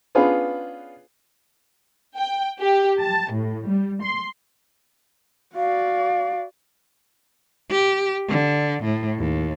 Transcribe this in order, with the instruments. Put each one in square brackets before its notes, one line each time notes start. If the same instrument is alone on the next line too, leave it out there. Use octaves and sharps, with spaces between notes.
[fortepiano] B3 C#4 D4 F4 G#4 B4
[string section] G5
G4
A5
A2
G3
C6
[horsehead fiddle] F#4 D5 [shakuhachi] F5
[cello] G4
D3
A2
D#2